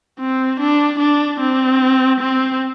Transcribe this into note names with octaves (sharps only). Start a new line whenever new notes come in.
C4
D4
D4
C4
C4